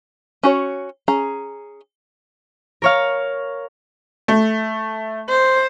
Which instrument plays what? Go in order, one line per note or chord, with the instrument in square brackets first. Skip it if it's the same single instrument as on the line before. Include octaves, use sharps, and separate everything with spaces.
[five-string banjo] C#4 F#4 C#5
C#4 G#4 A#5
[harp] A#4 C#5 F5
[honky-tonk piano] A3
[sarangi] C5